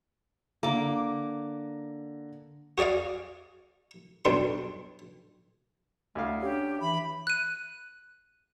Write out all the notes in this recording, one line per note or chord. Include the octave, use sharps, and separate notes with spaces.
D3 A#3 A#5 D6
F#4 G#4 D5 D#5 F5
B1 G2 C6
D2 A3 E4 F5
C#4 D4 G4
E3 E5 B5
F#6 D#7